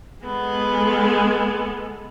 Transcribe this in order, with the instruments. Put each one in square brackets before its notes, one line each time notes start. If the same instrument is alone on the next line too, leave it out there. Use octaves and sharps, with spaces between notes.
[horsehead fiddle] G#3 A4 [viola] B3